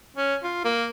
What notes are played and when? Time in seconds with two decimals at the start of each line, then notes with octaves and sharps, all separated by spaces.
0.16 C#4
0.43 F4
0.64 A#3